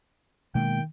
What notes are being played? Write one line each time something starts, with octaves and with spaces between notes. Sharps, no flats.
B2 D#3 G#3 A#3 G5